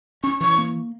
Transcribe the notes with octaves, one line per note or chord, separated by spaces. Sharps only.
C#4 C#6
E3 C#6
A#3